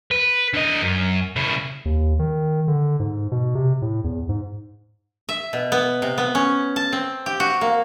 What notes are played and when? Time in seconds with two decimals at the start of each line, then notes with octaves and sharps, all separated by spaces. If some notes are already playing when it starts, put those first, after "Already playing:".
0.11 B4
0.54 D3 D#5
0.82 F#2
1.36 C#3 E4
1.85 D#2
2.19 D#3
2.68 D3
3.00 G#2
3.32 B2
3.55 C3
3.82 A2
4.04 E2
4.29 G#2
5.29 E5
5.53 B2
5.72 B3
6.02 C3
6.18 B3
6.35 C#4
6.76 A5
6.92 C4
7.26 G4
7.40 F#4
7.61 A#3